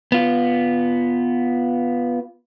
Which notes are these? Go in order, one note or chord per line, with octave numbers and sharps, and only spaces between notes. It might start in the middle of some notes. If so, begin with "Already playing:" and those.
B3 F4